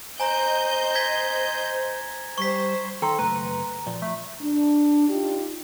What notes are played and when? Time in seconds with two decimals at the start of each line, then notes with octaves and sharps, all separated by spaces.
0.20 C5 D#5 G#5 A#5 G6
0.95 G#6 A#6 B6
2.38 G3 C5 C#6 B6
3.02 D#3 A4 G5 A#5 C6
3.19 F#1 A3 B4 A#5
3.86 A#2 F3
4.02 A3
4.41 D4
5.09 D4 D#4 F4 G4